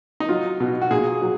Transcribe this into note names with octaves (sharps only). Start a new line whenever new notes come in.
D#4
F#3 F4
B2
F#4
A#2 G#4
F#3